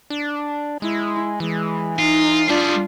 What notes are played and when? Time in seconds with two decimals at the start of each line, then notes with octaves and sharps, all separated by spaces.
0.10 D4
0.82 G#3 E4
1.40 E3 G#3
1.99 D#4 F4
2.49 G3 D4 F4 G#4